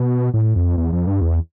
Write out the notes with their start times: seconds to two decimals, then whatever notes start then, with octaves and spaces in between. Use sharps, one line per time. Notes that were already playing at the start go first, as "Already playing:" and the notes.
Already playing: B2
0.34 A2
0.56 F2
0.78 E2
0.93 F2
1.07 G2
1.21 E2